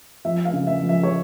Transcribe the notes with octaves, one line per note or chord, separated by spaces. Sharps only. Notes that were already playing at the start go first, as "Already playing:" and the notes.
F3 E5
F5
C#3
E5
F3
E5
C#5